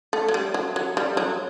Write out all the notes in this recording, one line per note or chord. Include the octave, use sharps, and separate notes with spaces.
A3
F#3
G3
F#3
F#3
G3
F#3